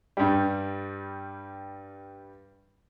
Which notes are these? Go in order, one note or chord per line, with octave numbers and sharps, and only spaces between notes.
G2 G3